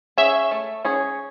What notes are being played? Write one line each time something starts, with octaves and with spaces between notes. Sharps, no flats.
C#4 G#4 E5
A3
C#4 G#4 C#5